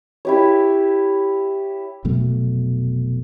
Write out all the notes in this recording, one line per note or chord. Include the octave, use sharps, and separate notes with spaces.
E4 G4 C#5
F1 B2 F#3 A3